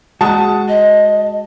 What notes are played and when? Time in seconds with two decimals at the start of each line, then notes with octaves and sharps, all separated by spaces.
0.21 G#3 F#4 A5 D#6
0.69 D#5